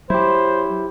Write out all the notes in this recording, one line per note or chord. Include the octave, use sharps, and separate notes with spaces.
F#3 E4 G4 C5